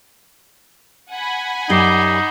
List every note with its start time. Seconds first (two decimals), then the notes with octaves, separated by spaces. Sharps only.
1.11 F#5 G#5 B5
1.70 F#2 D#4 G4 D5 D6 C7 G7